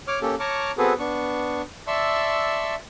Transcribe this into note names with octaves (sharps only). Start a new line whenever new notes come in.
C#5 D6 F6
A#3 C#4 G4 A4
C#5 A5 A#5 C#6 D6 F6
B3 C4 F#4 G#4 A4 B4
B3 D4 C#6
D5 E5 A5 C6 C#6 E6